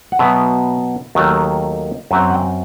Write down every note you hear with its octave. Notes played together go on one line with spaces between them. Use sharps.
F#5
B2 F#3 B3 E5
D#2 D#3 F#3 A3
F#2 F#3 C4 E5
F#5
G5